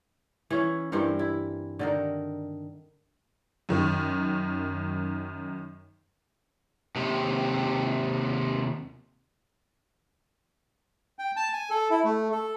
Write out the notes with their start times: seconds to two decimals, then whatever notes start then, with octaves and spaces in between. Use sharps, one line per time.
0.50 E3 C#4
0.92 G2 E3 C4 A#4
1.19 E4
1.79 D3 D#3 A#4
3.69 F#2 D#3
6.96 D#2 C3
11.19 G5
11.37 A5
11.53 G#5
11.70 A4
11.90 E4
12.04 A3
12.32 A4